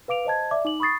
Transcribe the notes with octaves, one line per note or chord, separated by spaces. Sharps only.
B4 F5 D6 D7 F7
C5 D#5 A5 G#6
D5 E5 D6
D#4 D6 F#7
B5 C#6 D#6 A6 C7